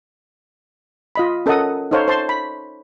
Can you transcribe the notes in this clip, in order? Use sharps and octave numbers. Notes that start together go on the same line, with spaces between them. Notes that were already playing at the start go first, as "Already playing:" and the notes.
F4 D#5 B5
C#4 A4 A#4 D#5 F#5 D#6
D#4 A4 C5 C#5 F5
C5 A5 C6
B5